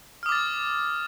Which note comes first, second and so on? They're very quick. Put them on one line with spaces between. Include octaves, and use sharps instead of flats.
F6 D#6 D6 A6